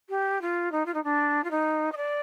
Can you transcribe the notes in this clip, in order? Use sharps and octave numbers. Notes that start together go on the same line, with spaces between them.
G4
F4
D#4
F4
D#4
D4
F4
D#4
D#5
D5